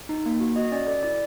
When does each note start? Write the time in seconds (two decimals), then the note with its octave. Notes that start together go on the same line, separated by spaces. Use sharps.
0.09 D#4
0.26 A#3
0.40 F#4
0.56 F#4 D#5
0.72 C#4 D5
0.87 A4 D5
1.03 E4 D5